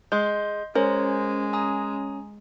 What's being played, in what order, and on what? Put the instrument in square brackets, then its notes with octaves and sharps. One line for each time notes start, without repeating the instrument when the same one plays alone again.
[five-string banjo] G#3 [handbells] D#5 C6 G6
[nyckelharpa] G#3 [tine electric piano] C#4 [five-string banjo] A#4 [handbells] C5 C#5
[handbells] G#5 A#5 D#6